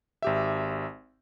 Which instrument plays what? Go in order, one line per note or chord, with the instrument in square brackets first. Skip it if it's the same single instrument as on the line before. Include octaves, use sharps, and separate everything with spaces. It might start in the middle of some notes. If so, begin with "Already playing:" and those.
[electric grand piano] G#1 G4 E5